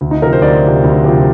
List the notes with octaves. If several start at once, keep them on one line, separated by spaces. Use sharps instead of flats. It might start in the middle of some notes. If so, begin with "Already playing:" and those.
D2
D#4
C3 F3 A#4
C5
D2 D5
C3 F3
D2
C3 F3